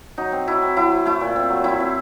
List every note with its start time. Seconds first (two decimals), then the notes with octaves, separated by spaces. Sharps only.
0.18 F#3 D#4
0.32 C4
0.47 F#3 E4
0.62 C4
0.77 F#3 E4
0.91 C4
1.05 A3 E4
1.21 A#2
1.36 C4
1.50 F#3
1.64 C4 E4
1.80 C4